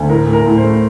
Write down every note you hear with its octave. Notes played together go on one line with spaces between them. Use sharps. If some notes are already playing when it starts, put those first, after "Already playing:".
Already playing: D2
A2 A#4
A2
A#4
A2
C5
A3